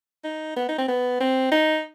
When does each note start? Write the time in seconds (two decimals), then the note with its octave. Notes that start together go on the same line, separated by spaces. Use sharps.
0.24 D#4
0.56 B3
0.69 D#4
0.79 C4
0.88 B3
1.20 C4
1.52 D#4